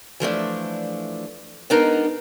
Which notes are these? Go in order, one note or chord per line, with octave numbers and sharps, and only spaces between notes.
E3 F3 A3 D4
G#3 B3 D4 D#4 A#4